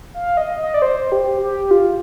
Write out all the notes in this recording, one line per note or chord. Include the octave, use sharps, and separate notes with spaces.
F5
D#5
D#5
D5
C5
G4
G4
F4